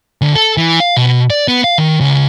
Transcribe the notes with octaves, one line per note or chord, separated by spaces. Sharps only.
D2
A4
E3
F5
B2
D5
B3
F5
D#3
C#2